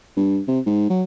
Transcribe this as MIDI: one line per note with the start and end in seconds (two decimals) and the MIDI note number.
0.17 0.40 43
0.48 0.60 48
0.66 0.89 44
0.90 1.03 54